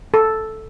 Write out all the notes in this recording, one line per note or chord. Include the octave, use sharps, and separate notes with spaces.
A4